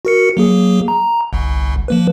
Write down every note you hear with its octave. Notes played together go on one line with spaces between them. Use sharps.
F#4 A#4 C#7
F#3 A#3 G#4
A#5
G1 C2
F3 A#3 B4